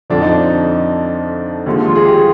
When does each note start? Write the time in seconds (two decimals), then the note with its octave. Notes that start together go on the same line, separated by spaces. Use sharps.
0.10 F2 D3 F3 D4
0.22 D#4
0.34 D4
1.66 D#2 D3 F3 G#3
1.86 F4
1.95 G#4
2.06 G4